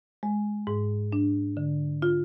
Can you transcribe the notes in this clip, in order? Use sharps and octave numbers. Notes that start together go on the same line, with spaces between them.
G#3
G#2
D4
D3
F4